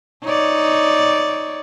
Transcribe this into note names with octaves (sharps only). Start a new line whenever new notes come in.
D#4 C#5 D5